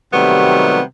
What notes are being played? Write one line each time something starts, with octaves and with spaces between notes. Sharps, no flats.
C3 D#3 F#3 G3 A3 B3